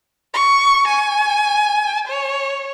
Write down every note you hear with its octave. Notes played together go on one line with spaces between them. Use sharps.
C#6
G#5
C#5